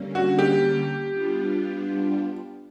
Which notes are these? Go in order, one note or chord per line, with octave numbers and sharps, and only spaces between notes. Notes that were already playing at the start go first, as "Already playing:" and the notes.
Already playing: D3 G3 A#3 C#4
F#4
G4
G3 B3 D4 F4